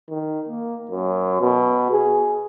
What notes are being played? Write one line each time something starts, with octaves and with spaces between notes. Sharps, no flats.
D#3
A#3
F#2
B2
G#4